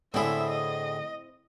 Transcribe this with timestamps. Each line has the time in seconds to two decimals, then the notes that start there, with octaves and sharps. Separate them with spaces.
0.14 A2 D3 C4 E4 G#4 E5
0.49 D#5